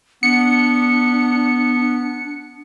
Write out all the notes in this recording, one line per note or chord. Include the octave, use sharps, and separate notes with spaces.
B3 D4 C#7